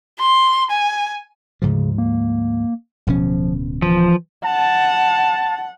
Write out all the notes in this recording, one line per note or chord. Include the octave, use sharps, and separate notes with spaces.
C6
G#5
D2 G#2 C#3 F3
A#3
D1 B2 F3 C#4
E3 F3
F#5 A5